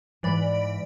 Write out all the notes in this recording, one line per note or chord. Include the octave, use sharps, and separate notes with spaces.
G#2 E3 D5 B5